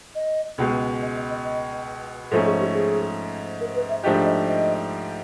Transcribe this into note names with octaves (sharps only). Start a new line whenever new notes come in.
D#5
C#2 B2 G#3
D#5
D#5
D#5
D#5
G#2 F3 A3 C#4 A4
G#4
G4
G#4
A#4
B4
E5
G#2 F3 A3 D4 G4 D#5
D#5
D#5